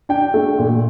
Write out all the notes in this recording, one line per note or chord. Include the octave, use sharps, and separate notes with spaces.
D4 G5
A3
A#2